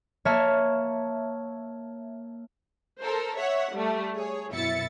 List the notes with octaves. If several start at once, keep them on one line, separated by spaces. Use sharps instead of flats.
A#3 C#5 E5 A5 F6
A4 A#4 C5
C#5 E5 F#5
G3 A3
G#4 C#5
F#2 B2 E4 E5 A6 C#7